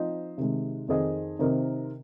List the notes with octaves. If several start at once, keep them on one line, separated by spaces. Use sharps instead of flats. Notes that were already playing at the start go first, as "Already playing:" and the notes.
Already playing: F3 C4 D#4 C5 D#5
C3 D#3 G#3
F2 D#3 C4 G#4 D#5
C3 D#3 C4 D#4 A#4